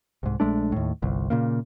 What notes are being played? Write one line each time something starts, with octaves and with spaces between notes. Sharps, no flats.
C2 G#2
A#1 G#3 A3 D4
D#2 A2
G1 C2
A#2 C#3 A#3